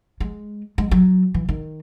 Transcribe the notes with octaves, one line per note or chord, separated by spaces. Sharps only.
G#3
G#3
F#3
E3
D#3